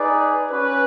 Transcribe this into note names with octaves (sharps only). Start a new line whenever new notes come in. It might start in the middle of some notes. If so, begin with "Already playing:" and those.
Already playing: D#4 G#4 B4 D5
C#4 F#4 B4